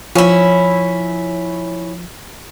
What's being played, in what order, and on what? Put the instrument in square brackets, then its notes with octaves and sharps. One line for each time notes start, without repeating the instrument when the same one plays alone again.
[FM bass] F3 [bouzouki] C#4 E4